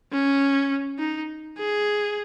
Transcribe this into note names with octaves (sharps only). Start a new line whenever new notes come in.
C#4
D#4
G#4